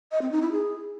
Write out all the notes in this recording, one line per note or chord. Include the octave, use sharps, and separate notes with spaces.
D#5
C4
D#4
E4
G#4